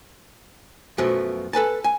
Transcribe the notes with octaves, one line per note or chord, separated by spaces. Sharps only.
F#2 B2 F3 A3
A4 B4 G#5 A5
G#5